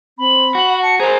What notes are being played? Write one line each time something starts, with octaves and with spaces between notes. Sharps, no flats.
C4 B5
F#4
F#5
A5 C#7
G#4 A#4 C5 A#5